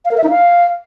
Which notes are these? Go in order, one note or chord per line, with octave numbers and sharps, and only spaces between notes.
F5
A#4
E5
D#4
F5